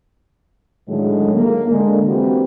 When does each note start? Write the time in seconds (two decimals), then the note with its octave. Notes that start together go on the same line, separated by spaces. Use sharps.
0.88 A2 D3 D#3 F#3 G#3
1.34 A#3
1.70 D3 G#3
2.07 E3 A#3 C4 F#4 G4 B4